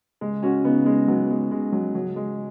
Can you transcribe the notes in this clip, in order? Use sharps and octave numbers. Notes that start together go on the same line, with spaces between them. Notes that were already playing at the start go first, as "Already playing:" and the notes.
C#2 G#3
C#4 F#4
C#3 B3 D#4
G#3 C#4
C#2 F#3 B3
G#3
C#3 G#3
F#3
C#2 F#3
G#3